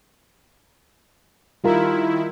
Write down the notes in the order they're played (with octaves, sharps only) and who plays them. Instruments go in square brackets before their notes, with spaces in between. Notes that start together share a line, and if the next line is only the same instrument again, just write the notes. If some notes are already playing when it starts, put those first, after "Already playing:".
[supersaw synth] D#3 E4 [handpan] G3 F4 A#4